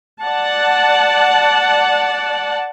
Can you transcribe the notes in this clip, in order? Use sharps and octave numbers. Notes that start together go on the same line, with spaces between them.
D5 F#5 A5